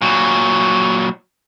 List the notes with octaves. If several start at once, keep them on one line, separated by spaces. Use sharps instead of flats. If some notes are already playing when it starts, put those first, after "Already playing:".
A#2 F#3